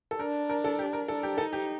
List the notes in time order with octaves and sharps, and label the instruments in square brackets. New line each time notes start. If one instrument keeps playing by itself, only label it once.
[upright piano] A4
[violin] D4 [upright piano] A#4
[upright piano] A#4
A4
G4
A#4
[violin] D4 [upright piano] A4
[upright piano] G4
[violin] D#4 [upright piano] A4
[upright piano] G4